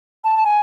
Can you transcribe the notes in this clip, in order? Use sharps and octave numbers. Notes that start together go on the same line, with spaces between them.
A5
A5
G#5